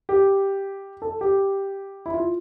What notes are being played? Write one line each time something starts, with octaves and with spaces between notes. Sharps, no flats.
G4
A4
G4
E4
F4